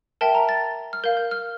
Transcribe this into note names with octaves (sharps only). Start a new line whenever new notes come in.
A#4 E5 G5 A5
A#5
A6
F6
A#4 F5 G6
G6
F6